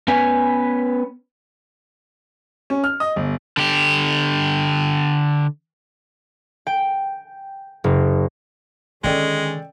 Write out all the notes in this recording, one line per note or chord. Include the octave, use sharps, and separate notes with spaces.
B3 C#4 B4 G#5
C#4
F6
D#5
G1
D3 G4
G5
F#1
D3 D#3 G#3 C#4 A4 D5 D#5 G5